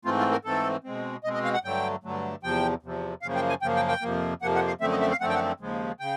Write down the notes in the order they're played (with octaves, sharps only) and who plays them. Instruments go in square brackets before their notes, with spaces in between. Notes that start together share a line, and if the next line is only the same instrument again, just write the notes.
[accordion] G#2 E3 A3 C4 F4
F4
A#4
G#2 E3 A3 C4 A4
B2 G#3 C4
B2 G#3 C4 D#5
D#5
F5
F#5
G2 D3 F#3 A3 G5
G2 D3 F#3 A3
E2 C3 F3 G5
E2 C3 F3
F#2 C#3 F3 A#3 F5
G5
G#5
F#2 C#3 F3 A#3 G5
G5
G5
F2 C3 F3 A#3
F2 C3 F3 A#3 F#5
F#5
F5
F#2 D3 F3 A3 C4 E5
D#5
E5
F5
F#2 D3 F3 A3 C4 F#5
G5
F#5
D#2 C#3 F3 G#3
C#3 G5